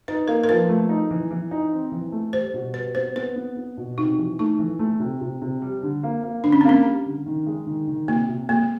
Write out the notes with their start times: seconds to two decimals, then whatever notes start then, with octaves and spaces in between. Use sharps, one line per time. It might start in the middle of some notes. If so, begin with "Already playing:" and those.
0.08 D#4 B4
0.28 A#3 A#4
0.44 A#4
0.49 F3 B4
0.69 A3
0.89 D#4
1.11 E3
1.31 E3
1.51 D#4
1.71 C4
1.92 E3
2.12 A3
2.33 G3 C5
2.54 B2
2.74 G3 B4
2.95 B3 C5
3.16 B3 B4
3.36 B3
3.57 B3
3.77 B2
3.98 C3 D#4
4.18 E3
4.39 A3 D#4
4.59 E3
4.79 A3
5.00 C3
5.21 C3
5.42 C3
5.62 G3
5.83 D3
6.03 A#3
6.23 A#3
6.44 D3 D4
6.52 C#4
6.61 C4
6.65 A#3 C#4
6.85 G3
7.06 D3
7.26 D#3
7.46 G#3
7.67 D#3
7.88 D#3
8.08 C3 A#3
8.29 C3
8.49 G#3 A#3